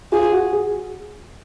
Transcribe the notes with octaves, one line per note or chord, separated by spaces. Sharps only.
F4 G#4
F#4
G#4